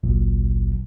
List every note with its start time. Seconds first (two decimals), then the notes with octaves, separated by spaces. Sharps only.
0.03 G#1 C#2 A#2 F#3